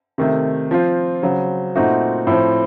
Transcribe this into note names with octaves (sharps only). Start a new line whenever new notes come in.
C3 D#3 A3
F3 C4 F4
C#3 F#3 C4
A#2 A3 C4 D#4 F#4
A2 F3 C4